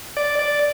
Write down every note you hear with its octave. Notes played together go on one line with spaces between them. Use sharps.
D5
D5